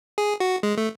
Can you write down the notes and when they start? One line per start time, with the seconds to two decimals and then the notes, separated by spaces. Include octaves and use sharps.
0.18 G#4
0.40 F#4
0.63 G#3
0.77 A3